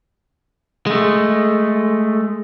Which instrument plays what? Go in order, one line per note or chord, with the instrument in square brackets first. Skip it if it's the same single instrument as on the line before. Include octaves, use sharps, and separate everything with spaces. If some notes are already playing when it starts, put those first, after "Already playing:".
[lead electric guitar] G#3 A3